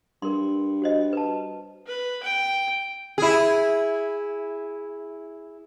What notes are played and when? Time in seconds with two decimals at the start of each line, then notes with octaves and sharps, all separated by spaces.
0.22 G2 A#4 C6
0.82 F#4 C5 D#5
1.13 B4 A5
1.86 B4
2.23 G5
3.18 E4 G#4